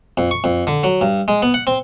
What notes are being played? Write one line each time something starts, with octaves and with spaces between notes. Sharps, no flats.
F2
C#6
F2
D3
F#3
G2
G#3
B3
F#5
C4